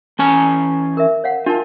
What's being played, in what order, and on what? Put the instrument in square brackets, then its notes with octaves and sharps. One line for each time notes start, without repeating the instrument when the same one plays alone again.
[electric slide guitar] E3 C#4 G#5 [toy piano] A5
[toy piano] A#4 E5
C#5 F5 F#5
[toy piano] D4 A#4 A5 [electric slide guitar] F4